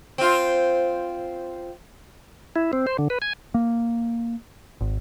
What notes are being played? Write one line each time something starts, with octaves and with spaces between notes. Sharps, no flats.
C4 F4
E4
C4
C5
D3
B4
G#5
A#3
G#1